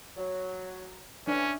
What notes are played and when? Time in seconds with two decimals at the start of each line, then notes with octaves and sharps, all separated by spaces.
0.17 F#3
1.27 A2 E3 C#4 D4 E5